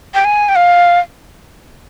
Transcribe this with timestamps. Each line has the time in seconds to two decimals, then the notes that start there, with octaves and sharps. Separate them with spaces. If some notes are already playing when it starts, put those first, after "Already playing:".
0.14 G5
0.25 G#5
0.49 G5
0.56 F5